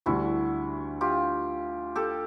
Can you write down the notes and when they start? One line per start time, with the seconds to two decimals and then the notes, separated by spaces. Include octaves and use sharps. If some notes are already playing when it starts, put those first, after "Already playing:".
0.06 D2 D3 G3 E4 F#4
1.01 F4 G4
1.96 G4 A4